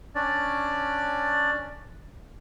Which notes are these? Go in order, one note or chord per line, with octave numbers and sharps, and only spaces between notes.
C#4 D4 D5